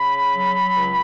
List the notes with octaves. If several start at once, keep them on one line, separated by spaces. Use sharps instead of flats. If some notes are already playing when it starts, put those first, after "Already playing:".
Already playing: C#3 B5
F#3
C#2